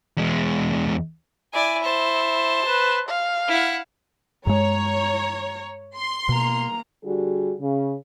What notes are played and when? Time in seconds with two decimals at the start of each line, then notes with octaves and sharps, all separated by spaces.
0.17 E2 G#3
1.54 E4 D5 G#5
1.83 C5 A5
2.67 B4
3.09 F5
3.48 E4 F#5
4.47 G2 G#3 C#5 A#5
5.95 C6
6.29 B2 A#3 A#5
7.04 D3 G3 F#4 G#4
7.60 C#3